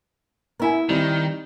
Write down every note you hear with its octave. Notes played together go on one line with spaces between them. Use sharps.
B3 E4 A#4 E5 G#5
D#3 G3 C4 D#4